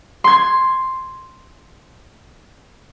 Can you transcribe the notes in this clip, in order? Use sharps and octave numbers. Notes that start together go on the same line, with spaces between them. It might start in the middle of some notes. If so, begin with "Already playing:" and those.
C6 G#6